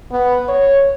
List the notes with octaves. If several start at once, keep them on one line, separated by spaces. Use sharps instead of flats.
B3
C#5